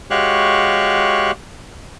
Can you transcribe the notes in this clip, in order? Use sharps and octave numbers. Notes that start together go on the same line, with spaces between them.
G#3 F#4 G4 C#5 F5 F#6